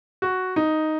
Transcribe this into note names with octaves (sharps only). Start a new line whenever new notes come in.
F#4
D#4